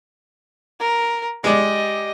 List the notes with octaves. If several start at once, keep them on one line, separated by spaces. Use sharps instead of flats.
A#4
G#3 G4 D5 D#5